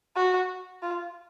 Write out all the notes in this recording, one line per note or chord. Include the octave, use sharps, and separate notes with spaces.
F#4
F4